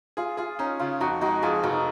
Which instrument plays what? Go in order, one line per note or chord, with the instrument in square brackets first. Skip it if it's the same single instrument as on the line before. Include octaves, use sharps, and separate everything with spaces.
[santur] F4 [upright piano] G#4
[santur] F4 [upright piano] G#4
[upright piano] C#4 [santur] D#4
[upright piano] C#3 [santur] F4
[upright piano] F2 [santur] D#4 F#4
[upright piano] G#3 [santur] D#4 F#4
[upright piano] F2 [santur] F4 G#4
[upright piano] F1 [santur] D#4 F#4